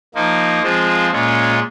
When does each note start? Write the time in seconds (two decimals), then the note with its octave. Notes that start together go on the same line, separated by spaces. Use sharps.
0.15 F3 A#3 D#4
0.63 F3 G#3 C4 F4
1.11 A#2 G#3 C#4 F4